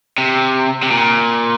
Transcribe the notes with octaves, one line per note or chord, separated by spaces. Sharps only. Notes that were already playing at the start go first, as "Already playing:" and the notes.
C3
C3
A#2